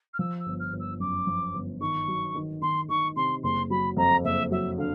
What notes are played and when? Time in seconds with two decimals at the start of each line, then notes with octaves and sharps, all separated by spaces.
0.13 F6
0.19 F3 E6
0.39 E6
0.46 G1
0.59 F6
0.72 G1
0.79 E6
1.00 F#2 D6
1.27 F3
1.54 G1
1.80 D#3 C#6
2.08 F#3
2.35 D#3
2.61 D#3 C6
2.89 D#3 C#6
3.16 C3 C6
3.43 F#1 C6
3.70 F#3 B5
3.97 F2 A#5
4.24 F#1 E5
4.51 F#3 E5
4.78 D3 F5